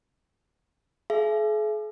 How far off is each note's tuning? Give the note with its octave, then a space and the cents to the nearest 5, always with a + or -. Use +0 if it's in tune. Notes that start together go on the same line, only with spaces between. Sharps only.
G#4 +45 E5 +35